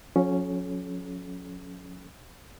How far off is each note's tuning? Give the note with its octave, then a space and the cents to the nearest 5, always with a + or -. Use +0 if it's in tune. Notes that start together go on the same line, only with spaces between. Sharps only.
F#3 -45 C#4 +0 A4 -40